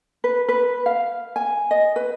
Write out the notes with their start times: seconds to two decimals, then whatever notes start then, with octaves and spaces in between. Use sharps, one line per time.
0.24 B4
0.49 B4
0.86 F5
1.36 G#5
1.71 D#5
1.96 B4